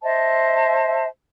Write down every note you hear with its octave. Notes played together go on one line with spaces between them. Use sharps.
C5 D#5 E5 A5